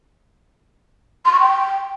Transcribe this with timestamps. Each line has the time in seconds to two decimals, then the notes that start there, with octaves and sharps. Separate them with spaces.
1.25 C6
1.33 C#6
1.40 G5